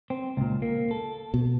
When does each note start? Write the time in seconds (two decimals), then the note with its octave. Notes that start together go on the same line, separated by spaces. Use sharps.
0.10 C4
0.37 C#2 A#2
0.62 A#3
0.91 A4
1.34 B2